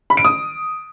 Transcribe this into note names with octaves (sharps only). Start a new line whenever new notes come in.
B5
D7
D#6